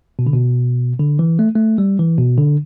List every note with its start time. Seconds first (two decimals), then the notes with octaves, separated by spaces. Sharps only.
0.19 B2
0.26 D3
0.33 B2
0.99 D3
1.19 E3
1.39 A3
1.55 A3
1.78 G3
1.99 E3
2.18 B2
2.38 D3